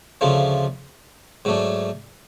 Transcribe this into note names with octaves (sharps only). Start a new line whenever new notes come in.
D2 C#3 F3 A3 F4
G#2 F#3 A3 D4